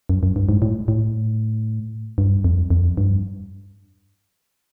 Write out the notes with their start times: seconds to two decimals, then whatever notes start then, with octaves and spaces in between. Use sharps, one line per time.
0.09 F#2
0.23 F#2
0.36 G2
0.49 G#2
0.62 A2
0.88 A2
2.18 G2
2.44 F2
2.70 F2
2.97 G2